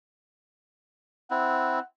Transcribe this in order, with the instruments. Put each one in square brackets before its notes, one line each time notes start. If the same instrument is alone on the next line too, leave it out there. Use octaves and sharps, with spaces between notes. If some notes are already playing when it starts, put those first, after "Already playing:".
[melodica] C4 E4 [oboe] F#5